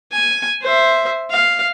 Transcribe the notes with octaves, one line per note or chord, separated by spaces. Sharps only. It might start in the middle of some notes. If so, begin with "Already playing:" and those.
G#5
C5 E5
F5